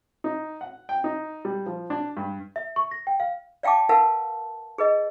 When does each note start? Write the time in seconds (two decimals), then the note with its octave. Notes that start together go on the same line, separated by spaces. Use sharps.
0.24 D#4
0.61 F#5
0.89 G5
1.04 D#4
1.45 G3
1.66 F3
1.90 D4
2.17 G2
2.56 E5
2.76 C#6
2.91 A#6
3.07 G5
3.20 F5
3.63 D5 F5 G5 A5 D6
3.89 A#4 B4 F5 F#5 A5
4.78 G#4 B4 D#5